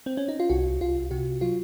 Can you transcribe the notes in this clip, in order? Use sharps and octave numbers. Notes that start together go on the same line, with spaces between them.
C4
C#4
D#4
F4
C2 F#4
C2 F4
C3 F#4
F#3 F4